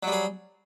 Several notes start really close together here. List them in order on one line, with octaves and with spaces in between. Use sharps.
F#3 G3 G#4